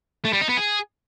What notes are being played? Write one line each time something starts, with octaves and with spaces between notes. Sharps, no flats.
A3
G3
D#4
B3
G#4